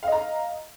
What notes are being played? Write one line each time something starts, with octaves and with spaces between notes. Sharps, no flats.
D#5 F5 A#5